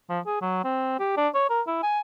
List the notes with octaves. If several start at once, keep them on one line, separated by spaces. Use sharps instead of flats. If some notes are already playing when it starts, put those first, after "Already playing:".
F3
G#4
F#3
C4
G4
D4
C#5
A#4
E4
G#5